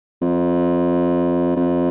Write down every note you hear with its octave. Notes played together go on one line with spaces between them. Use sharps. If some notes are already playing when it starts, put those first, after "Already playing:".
F2
F2